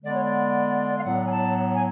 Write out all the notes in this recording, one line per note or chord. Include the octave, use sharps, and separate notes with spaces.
D3 G#3 B3 D5
C#5
D5
F5
A2 F#3 B3 F#5
G#5
A5
G#5